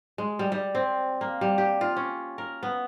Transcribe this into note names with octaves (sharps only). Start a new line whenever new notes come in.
G#3
G3
G3
C4
A#3
G3
G4
F4
C#4
A#4
B3